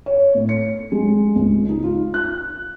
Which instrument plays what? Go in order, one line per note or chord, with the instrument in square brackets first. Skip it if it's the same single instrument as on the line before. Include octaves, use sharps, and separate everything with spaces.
[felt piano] C#5
A2
C#7
G#3
C#2
D#4
F4
F#6